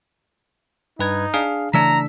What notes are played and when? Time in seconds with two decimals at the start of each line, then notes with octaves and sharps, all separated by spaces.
0.99 G2 D#4 B4 G#6
1.34 D4 G#4 F5
1.73 C#3 E3 A3 D4 A#5 E6 B6